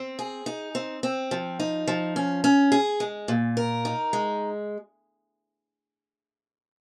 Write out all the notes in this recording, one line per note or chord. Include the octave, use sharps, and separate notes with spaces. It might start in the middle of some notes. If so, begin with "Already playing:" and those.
Already playing: C4
G#4
D#4
C4
C4
F3
D#4
F3
C#4
C#4
G#4
G#3
A#2
A#4
D#4
G#3